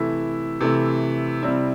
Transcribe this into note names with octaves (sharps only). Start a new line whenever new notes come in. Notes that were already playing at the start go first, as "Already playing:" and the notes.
Already playing: C3 E3 A3 E4
C3 E3 A3 E4
C3 G3 C4 E4